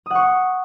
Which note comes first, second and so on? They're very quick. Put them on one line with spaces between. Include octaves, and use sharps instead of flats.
D#6 F#5 C#6